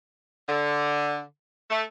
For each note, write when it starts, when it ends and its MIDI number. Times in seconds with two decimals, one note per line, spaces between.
0.49 1.22 50
1.71 1.83 57